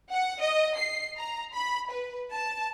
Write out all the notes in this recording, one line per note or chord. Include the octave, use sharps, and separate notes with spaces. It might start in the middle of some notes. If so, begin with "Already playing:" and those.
F#5
D#5
C7
A#5
B5
B4
A5